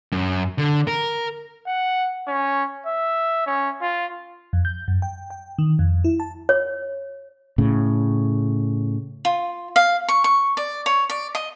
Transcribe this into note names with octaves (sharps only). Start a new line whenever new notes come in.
F#2
D3
A#4
F#5
C#4
E5
C#4
F4
F2
G6
F#2
G5
G5
D#3
F2
E4
A5
C#5
A2 C#3
F4
F5
C#6
C#6
D5
C#5
D5
D#5